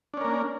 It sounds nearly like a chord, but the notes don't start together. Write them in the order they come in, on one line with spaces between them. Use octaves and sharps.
D4 C#4 A#4 A#3